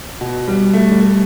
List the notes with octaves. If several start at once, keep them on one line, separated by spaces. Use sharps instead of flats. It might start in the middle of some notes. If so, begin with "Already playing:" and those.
B2
G3
A3
G3
A3